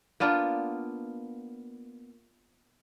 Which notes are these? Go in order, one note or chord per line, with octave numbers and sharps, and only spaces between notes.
A#3 B3 D4 F4